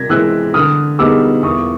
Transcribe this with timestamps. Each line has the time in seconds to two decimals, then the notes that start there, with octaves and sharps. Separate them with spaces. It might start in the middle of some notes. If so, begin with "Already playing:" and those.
Already playing: C3 G#6 A#6 B6
0.09 E3 G#3 C4 E6 F#6
0.54 D3 D#6 F6
0.99 G3 B3 D#4 G#4 D6 E6
1.43 E2 C#6 D#6